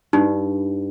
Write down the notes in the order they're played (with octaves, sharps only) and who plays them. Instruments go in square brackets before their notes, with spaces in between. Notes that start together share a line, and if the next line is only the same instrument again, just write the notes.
[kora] G2 [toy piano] D#4